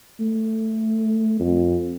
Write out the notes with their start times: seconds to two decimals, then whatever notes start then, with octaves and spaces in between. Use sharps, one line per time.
0.20 A3
1.40 F2